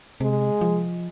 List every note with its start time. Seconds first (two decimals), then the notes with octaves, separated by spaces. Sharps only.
0.20 C3 G#3
0.61 F3